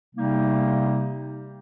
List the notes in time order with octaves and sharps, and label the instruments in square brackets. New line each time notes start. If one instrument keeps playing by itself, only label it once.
[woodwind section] C3 G3 A#3 D#4